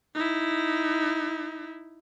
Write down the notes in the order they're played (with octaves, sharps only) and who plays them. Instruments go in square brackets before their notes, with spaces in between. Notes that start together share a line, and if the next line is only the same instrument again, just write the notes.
[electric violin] D#4 E4